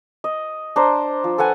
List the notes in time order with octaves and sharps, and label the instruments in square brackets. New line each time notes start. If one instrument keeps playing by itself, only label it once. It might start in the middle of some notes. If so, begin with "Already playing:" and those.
[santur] D#5
D4 C5 A#5
F3
A4 B4 F#5 G#5